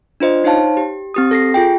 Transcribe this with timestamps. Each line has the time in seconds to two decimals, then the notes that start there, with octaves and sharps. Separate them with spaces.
0.20 D4 F4 C5 D#5
0.44 D#4 C5 C#5 F5 A5
0.77 G4
1.14 C4 G4 D#6
1.31 A4 A#6 C7
1.54 F4 G#4 G5